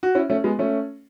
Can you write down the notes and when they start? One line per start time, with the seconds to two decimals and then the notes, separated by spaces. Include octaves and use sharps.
0.03 F#4
0.15 C#4 E4
0.30 A3 C#4
0.44 G#3 B3
0.59 A3 C#4